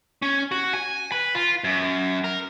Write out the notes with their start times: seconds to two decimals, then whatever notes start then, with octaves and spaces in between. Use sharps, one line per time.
0.22 C#4
0.52 F#4
0.73 G#5
1.12 B4
1.35 F4
1.64 F#2
2.24 A#4